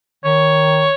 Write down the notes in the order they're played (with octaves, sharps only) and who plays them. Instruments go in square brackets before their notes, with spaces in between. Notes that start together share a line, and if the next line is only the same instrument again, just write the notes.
[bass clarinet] D#3 [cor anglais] C#5